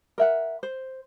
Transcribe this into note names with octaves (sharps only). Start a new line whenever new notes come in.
A#4 E5 F#5
C5